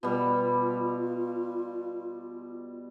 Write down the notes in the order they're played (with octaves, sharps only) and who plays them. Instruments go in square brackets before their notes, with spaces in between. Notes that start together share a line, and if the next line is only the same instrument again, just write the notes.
[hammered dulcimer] B2 G3 [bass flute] F4